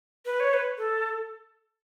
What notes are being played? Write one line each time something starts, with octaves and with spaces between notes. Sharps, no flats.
B4
C#5
B4
A4